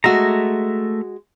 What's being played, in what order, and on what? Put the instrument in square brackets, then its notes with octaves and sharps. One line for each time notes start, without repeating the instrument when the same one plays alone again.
[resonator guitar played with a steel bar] G#3 F#4 [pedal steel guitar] A3 E5 A#5